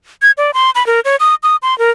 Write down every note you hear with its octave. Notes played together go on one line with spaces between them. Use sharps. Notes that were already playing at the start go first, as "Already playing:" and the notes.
G#6
D5
C6
B5
A#4
C#5
D#6
D#6
C6
A#4